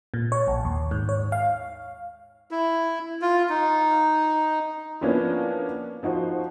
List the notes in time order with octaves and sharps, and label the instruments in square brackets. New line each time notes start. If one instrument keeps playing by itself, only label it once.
[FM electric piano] A#2
C#5
A#1
D#2
G#2
C#5
F5
[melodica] E4
F4
D#4
[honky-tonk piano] F3 A#3 B3 C#4 D4 E4
F3 D#4 F#4 C5